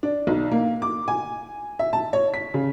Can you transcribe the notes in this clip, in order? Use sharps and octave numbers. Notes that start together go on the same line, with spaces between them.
D4
B1
A#3
D6
G#5
E5
A5
C#5
B6
C#3